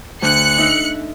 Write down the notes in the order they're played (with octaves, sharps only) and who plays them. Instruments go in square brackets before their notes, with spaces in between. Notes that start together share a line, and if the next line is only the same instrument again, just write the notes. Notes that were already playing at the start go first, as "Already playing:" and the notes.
[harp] D2 G6 [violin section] F#6 C#7
[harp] D#4 E5